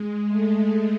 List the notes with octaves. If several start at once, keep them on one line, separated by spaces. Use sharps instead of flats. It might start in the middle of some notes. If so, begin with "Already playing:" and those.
Already playing: G#3
A3